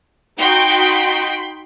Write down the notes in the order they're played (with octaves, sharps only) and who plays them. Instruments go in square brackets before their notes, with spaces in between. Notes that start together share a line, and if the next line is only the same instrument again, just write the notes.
[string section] D#4 F#4 G5 [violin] B5 C6